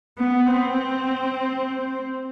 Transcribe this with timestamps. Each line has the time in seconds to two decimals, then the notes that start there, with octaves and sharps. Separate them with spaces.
0.18 B3
0.47 C4